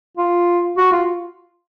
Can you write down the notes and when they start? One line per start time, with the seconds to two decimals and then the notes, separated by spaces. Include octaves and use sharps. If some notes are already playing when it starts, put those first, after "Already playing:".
0.18 F4
0.77 F#4
0.92 F4